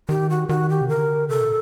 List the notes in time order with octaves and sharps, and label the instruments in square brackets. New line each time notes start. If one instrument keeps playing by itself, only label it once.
[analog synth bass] D#3 [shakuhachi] G4
[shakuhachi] F#4
[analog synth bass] D#3 [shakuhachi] F#4
[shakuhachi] G4
[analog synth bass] C3
[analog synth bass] D3 [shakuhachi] A#4
[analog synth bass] C3 [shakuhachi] A4
[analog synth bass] A#2